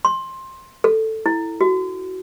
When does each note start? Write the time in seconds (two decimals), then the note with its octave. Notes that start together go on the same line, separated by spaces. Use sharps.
0.05 C6
0.84 A4
1.26 E4
1.61 F#4